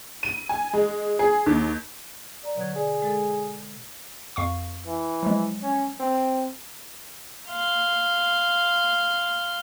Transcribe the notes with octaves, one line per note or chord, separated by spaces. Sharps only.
D#7
G#5
G#3
G#4
D#2
D5 A#5
B2 D3 F#3 G#6
G#4 D5
G#3 A4 A6
F2 F5 C#6
E3
F3 F#3 G#3
C#4
C4
F5 C6